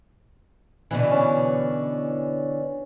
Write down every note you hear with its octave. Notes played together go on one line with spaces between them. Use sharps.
B2 D3 E3
C#4